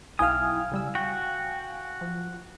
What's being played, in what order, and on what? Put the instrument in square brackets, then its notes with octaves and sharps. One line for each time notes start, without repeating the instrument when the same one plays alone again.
[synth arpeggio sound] B1 E4 G5 [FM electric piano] F5 G#5 [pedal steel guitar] D#6 F6
[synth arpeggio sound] C#3 G3 E6
[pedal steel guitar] F#4 [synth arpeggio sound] G5
[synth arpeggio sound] F3